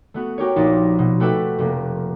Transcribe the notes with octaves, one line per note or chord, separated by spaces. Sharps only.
A3 B3 F#4
F#4 G4 A#4 C#5
A#1 F3 A#3 D#4 A6
B2
A3 F#4 G4 A4 B4 E5
F1 A#3 G4